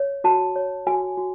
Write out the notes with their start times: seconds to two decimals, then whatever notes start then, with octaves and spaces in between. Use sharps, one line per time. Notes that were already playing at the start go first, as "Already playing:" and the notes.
Already playing: C#5
0.24 F#4 A5
0.56 C#5
0.87 F#4 G#5
1.18 F#4